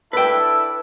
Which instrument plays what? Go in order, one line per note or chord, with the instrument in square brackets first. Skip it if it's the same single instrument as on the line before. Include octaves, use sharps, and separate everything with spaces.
[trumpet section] D4 E4 A4 [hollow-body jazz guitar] B4 G5